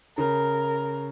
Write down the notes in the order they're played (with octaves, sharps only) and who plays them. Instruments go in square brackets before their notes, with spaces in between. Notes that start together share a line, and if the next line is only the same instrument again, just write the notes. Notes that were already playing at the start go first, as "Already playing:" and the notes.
[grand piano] C#3 [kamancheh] A#4